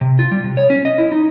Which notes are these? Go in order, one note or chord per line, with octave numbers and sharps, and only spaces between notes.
C3
F4
G3
C3
C#5
C#4
D#5
E4
D#4